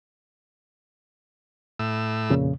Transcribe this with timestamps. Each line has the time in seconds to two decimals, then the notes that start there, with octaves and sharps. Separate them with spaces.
1.79 A2 E6
2.30 F2 A#2 C#3